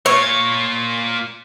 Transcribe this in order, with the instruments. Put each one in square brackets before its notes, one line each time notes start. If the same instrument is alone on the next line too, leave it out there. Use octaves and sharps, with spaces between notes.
[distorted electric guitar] A#3 F4 [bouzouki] C#5